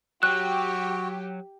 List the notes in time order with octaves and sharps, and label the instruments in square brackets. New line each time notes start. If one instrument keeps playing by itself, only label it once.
[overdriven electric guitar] F#3 [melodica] F#4 [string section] G4 [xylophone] F#6